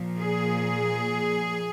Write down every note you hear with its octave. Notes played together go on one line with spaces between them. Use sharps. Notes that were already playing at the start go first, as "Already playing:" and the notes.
Already playing: A#2 F3
G#4